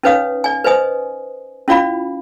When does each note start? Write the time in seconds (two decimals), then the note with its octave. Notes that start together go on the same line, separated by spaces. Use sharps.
0.03 C#4 D#4 B4 C#5 F5 D#6
0.44 D5 G#5
0.64 B4 C5 D#5 G#5 D#6
1.68 C#4 E4 F4 D5 F5 B5